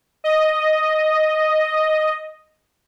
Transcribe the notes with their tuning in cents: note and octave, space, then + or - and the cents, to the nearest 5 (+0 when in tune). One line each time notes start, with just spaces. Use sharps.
D#5 +0